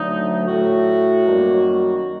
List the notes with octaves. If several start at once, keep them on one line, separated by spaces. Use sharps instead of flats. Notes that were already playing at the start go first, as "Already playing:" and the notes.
Already playing: D2 D3 F#3 A3 D#4
A2 A3 F#4
F#2 D#3 G3 A#3